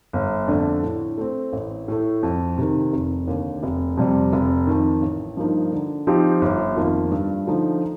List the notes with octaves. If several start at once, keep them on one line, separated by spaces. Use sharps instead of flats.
G1
F2 D3 A3 D4
A2
A3 C4
A1
A2 A3
F2
C3 D#3
F1
D#2 D3
F1
F2 C3 G3
F1
F2 D#3
A1
G2 F3 A#3 D#4
D3
F3 C4 D#4 G4
G1
F2 D#3 A#3 F4
G2
D3 F3 A3 D#4